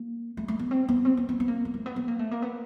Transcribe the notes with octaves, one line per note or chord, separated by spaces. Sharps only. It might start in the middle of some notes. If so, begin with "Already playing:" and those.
Already playing: A#3
A3
A3
B3
C4
B3
C4
B3
B3
B3
A#3
A#3
A3
B3
B3
A#3
A3
A#3
B3